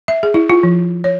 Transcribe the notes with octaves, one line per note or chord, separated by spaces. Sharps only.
E5
G#4
E4
F4
F3
C#5